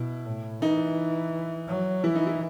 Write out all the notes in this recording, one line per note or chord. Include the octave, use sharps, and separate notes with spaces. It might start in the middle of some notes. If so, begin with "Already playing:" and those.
Already playing: B2 E4
A2
E3 D#4
F#3
E3 E4
D#4
E4